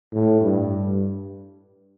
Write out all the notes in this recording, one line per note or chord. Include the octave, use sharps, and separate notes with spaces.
A2
G2